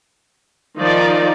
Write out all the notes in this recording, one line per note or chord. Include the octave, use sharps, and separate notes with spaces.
D#3 F3 D#4 D5